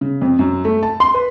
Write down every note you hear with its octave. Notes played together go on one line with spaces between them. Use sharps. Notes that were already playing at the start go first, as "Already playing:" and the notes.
C#3
F2
F#2
A3
A5
C6
B4